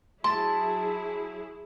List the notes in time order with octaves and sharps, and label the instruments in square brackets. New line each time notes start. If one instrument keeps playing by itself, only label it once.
[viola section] F#3 E4 G#4 [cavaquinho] A5 [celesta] C6